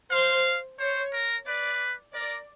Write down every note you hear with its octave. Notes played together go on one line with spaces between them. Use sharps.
C5 F5
C5 C#5
A#4
B4 D5
A#4 D5